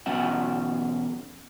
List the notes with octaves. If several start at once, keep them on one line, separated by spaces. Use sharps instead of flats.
E2 B2 F#3 C#4 E5 F#5